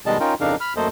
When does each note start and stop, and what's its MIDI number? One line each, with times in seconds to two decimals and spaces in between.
0.06 0.18 47
0.06 0.18 51
0.06 0.18 55
0.06 0.18 56
0.06 0.18 75
0.06 0.18 81
0.20 0.34 61
0.20 0.34 63
0.20 0.34 65
0.20 0.34 70
0.20 0.34 79
0.41 0.55 41
0.41 0.55 49
0.41 0.55 62
0.41 0.55 63
0.41 0.55 70
0.41 0.55 77
0.60 0.74 83
0.60 0.74 89
0.77 0.88 42
0.77 0.88 57
0.77 0.88 58
0.77 0.88 69
0.77 0.88 72
0.77 0.88 75